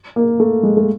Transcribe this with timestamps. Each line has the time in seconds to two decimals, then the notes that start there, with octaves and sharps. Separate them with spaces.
0.16 A#3
0.40 A3
0.63 G#3
0.77 A3